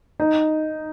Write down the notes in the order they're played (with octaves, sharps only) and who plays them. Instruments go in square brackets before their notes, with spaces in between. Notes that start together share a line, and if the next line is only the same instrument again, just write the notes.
[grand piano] D#4